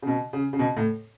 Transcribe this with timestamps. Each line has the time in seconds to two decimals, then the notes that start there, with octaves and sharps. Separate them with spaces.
0.02 C#3
0.07 B2
0.33 C#3
0.53 C#3
0.59 B2
0.77 A2